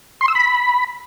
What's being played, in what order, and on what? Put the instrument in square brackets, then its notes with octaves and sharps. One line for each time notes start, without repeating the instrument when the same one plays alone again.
[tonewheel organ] C6
E6
B5